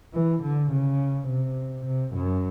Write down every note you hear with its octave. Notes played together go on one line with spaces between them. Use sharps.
E3
D3
C#3
C3
C3
F#2